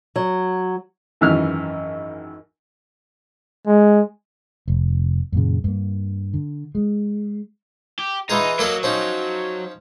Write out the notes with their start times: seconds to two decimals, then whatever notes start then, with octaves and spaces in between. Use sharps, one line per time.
0.16 F#3
1.21 G#1 F#2 E3 F6
3.66 G#3
4.68 F1
5.32 F#2 A#2 C#3
5.64 G2 A#3
6.34 D3
6.75 G#3
7.99 G4
8.30 E3 D#4 F4 G#4
8.59 F#3 A#3 A4 D#5
8.83 F3 C#4 D#4